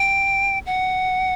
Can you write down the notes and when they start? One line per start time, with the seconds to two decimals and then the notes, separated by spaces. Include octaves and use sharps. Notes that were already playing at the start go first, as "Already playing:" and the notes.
Already playing: G5
0.66 F#5